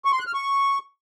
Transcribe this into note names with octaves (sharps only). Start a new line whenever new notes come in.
C#6
C6
F#6
F6
C#6